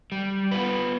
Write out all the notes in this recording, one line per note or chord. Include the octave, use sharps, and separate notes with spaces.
G3
B3 F4 B4